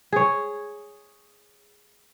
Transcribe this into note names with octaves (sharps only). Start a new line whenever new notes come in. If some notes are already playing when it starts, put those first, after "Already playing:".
G#4 C#5